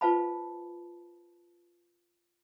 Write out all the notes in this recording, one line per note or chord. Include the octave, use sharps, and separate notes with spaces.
F4 B4 C5 F5 A5 B5